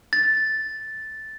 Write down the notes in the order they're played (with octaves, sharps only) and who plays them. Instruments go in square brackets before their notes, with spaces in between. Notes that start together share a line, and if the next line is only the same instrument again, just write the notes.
[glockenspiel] A6